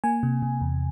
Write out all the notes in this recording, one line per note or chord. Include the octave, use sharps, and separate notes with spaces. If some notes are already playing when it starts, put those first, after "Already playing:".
A#3 G#5
C3
C3
E2